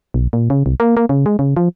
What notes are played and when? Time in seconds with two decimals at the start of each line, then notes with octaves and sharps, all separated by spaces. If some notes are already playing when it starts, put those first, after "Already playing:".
0.14 B1
0.33 A#2
0.50 C#3
0.66 C2
0.80 A#3
0.97 A#3
1.09 C#3
1.26 G#3
1.39 C#3
1.57 F3